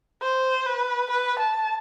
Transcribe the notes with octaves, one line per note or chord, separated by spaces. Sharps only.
C5
B4
B4
A5